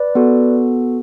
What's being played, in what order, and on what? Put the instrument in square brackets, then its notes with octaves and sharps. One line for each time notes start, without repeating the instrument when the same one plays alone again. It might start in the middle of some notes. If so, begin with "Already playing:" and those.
Already playing: [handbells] B4 D5
B3 F#4 A4